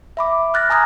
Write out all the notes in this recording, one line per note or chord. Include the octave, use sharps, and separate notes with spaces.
E5 B5 D6
F6 F#6 A6 A#6
G#5 A#5 D#6 F#6 G#6